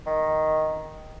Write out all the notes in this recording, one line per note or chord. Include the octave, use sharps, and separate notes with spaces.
D#3